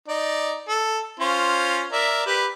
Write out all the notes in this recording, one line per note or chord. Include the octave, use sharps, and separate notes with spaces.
D#4 D5
A4
C#4 F4 C5
A#4 D5 E5
G4 B4